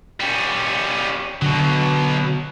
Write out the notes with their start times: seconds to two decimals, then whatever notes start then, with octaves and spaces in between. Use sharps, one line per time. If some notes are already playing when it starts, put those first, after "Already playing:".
0.20 G3 C#4
1.42 B2 D3 F#3